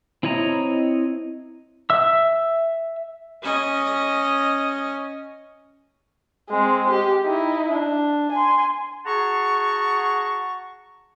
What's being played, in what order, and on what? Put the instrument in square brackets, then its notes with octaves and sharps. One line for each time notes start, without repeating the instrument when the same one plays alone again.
[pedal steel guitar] C4 E4 C#5 D#5 A#5
E5 E6
[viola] C#4 D#5
[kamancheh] G#3 C4
G4
D#4 E4
D4
G#5 C6
[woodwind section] F#4 G#4 F#5 A5 A#5 C#6